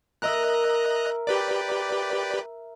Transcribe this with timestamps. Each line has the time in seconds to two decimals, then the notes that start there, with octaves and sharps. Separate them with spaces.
0.22 A#4 D#5 E5 A#5 F#6
1.27 G4 B4 D5